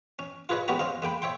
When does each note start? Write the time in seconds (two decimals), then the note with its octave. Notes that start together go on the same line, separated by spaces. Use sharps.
0.19 C#4
0.49 F4 G#4 B4 C#5 D#5
0.68 G#3 B3 C#4 F#4 G4 A#5
0.79 C#4 C5 D#5 F5
1.02 G#3 A#3 G5 B5
1.22 C#5 E5 G5 C6